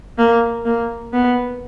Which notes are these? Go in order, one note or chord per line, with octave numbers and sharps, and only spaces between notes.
A#3
A#3
B3